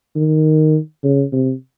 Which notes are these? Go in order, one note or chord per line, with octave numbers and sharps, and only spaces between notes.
D#3
C#3
C3